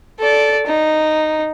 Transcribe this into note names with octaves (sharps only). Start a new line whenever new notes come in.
A4 D5
D#4